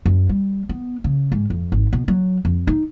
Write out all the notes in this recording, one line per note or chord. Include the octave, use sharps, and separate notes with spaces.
F#2
G3
B3
C#3
G#2
F2
G#1
B2
F#3
F2
D#4